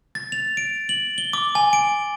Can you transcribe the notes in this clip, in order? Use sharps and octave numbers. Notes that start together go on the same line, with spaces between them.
A6
F7
D7
F#7
G7
D6
G#5
D7